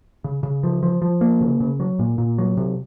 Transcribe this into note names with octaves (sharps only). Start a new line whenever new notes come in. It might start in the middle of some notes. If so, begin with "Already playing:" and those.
C#3
C#3
F3
F3
F3
A#3
C#3
C#3
F#3
A#2
A#2
F#3
C3